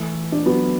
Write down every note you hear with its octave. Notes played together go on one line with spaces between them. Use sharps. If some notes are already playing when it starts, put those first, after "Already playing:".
Already playing: E3 A3
D4
F#3 B3